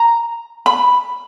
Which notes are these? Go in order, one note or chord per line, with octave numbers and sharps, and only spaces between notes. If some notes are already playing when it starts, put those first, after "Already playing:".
Already playing: A#5
B5